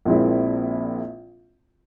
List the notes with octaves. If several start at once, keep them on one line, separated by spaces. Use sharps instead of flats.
A#1 A#2 G#3 C4 E4